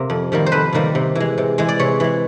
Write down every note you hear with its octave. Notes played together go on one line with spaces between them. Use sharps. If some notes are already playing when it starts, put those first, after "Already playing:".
Already playing: C3 A#3
F2
C3 D#3 G3 A#3
C5
F2 B4
C3 D#3 G3 A#3
C3
E3 G#3
C3
E3 G#3
D5
C3 C#5
E3 G#3